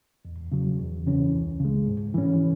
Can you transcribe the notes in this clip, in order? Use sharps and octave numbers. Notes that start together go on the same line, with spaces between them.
E2
C#3 F#3
E2
C#3 E3 C#4
C#2
C#3 G#3
G#2
E3 C#4